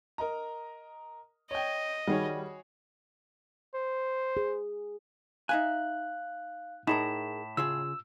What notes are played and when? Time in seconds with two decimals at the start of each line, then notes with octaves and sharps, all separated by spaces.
0.18 A#4 D#5 A#5
1.51 C#5 D#5 G5
2.07 D#3 G3 F#4 G#4 C#5
3.75 C5
4.37 G#4
5.49 D#4 E5 F5 G#5 F#6
6.87 A2 D#4 G#4 A#4 B6 E7
7.57 C#3 F4 G#4 E6